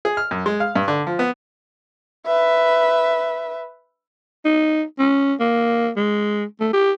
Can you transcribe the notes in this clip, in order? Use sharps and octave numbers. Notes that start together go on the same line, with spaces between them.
G#4
F6
F#2
G#3
F5
G2
D3
F3
B3
B4 E5
D#4
C#4
A#3
G#3
A3
G4